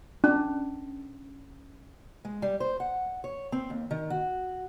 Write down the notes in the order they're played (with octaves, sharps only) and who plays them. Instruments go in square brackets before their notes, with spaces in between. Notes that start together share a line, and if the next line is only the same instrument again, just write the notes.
[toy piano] C#4 [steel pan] D4
[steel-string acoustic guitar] G#3
G3
C5
F#5
C#5
C4
D#2
D#3
F#4